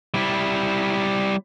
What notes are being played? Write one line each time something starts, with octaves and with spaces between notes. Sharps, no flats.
G3 E4